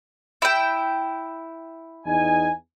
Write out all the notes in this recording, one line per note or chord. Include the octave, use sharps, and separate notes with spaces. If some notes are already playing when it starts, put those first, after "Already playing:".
E4 G5
E2 D#4 G#5